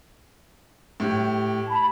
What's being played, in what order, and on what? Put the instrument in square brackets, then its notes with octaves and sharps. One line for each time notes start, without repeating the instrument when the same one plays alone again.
[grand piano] A2 G4
[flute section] A5 B5